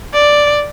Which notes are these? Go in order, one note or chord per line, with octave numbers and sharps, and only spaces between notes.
D5